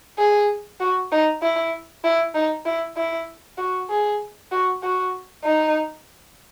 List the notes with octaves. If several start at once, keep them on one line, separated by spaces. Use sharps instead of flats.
G#4
F#4
D#4
E4
E4
D#4
E4
E4
F#4
G#4
F#4
F#4
D#4